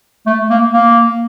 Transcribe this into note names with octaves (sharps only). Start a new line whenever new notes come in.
A3
A#3
A#3